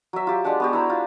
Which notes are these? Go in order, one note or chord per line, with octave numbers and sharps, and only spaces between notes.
F#3 E5
F4 G4
G#3 D4 F#5 A5
B3 F#4 G4
E4 C5 A#5
F4